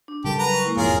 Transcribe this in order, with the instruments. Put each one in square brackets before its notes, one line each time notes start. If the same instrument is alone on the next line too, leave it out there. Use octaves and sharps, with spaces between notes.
[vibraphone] D4
[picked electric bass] C#3 G3 [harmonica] G4 [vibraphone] A4 A#4 A5
[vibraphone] F#3 G5 [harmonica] B4 A#5
[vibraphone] A#4 C#6
G#3 A#3 E4
[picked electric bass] E1 F2 G#2 [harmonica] F4 G#4 A#4 [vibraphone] C#5